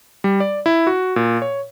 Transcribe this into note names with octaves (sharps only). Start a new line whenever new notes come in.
G3
D5
E4
F#4
A#2
C#5